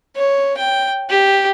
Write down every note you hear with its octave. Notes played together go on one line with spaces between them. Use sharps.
C#5
G5
G4